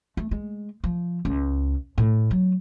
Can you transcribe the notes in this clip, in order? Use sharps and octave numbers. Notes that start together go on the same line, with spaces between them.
A3
G#3
F3
C#2
A2
F#3